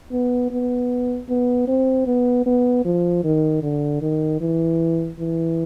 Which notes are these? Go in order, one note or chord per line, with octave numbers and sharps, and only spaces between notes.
B3
B3
B3
C4
B3
B3
F3
D#3
D3
D#3
E3
E3